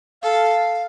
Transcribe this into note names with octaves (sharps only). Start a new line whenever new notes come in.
A4 F5